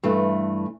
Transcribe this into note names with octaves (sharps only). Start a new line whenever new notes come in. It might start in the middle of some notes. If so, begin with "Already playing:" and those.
G2 E3 A3